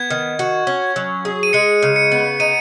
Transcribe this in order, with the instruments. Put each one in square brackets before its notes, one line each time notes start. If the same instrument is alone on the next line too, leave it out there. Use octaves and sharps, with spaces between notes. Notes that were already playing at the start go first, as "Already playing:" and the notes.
Already playing: [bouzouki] B3 [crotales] G#6
[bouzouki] D#3
F#4
C#4
F#3
G#4
[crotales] D#7
[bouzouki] G#3 [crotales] C#7
[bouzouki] C#3
[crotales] C#7
[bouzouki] B3
[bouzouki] D#4 [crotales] D#7